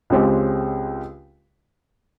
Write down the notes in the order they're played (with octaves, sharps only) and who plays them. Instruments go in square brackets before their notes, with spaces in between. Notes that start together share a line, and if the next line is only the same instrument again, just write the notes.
[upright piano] C#2 C#3 G#3 C4 G4